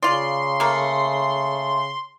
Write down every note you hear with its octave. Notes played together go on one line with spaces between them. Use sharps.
C#3 F4 D5 C6
A3 A#3